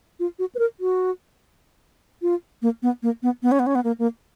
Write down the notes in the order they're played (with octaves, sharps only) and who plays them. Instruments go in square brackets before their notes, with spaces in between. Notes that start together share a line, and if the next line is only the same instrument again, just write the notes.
[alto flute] F4
F#4
B4
A#4
F#4
F4
A#3
B3
A#3
B3
B3
C#4
B3
C#4
B3
A#3
A#3